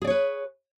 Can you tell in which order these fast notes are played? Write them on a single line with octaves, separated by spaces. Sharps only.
G#4 D5 C#5 B4